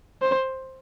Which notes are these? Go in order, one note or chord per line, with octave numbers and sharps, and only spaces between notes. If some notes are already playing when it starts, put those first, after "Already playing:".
C5